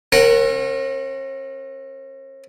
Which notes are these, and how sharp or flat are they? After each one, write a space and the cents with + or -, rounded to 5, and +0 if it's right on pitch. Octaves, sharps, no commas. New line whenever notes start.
C#4 -45 A#4 +0 F#5 +0